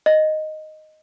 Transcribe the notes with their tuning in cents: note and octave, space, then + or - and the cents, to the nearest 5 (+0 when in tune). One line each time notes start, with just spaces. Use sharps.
D#5 -5